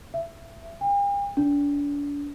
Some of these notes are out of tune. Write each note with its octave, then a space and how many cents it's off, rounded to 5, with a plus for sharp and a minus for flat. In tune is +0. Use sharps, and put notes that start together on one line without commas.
E5 +20
G5 +45
D4 -35